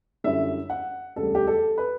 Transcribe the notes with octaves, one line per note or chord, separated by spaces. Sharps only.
F#2 D3 G3 C#4 E4 E5
F#5
E1 D2 C#3 G3 A4
G4
A4
B4